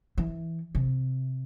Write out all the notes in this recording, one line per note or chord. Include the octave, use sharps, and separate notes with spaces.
E3
C3